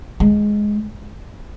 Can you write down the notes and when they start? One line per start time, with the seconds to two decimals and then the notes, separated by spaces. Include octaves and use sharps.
0.20 G#3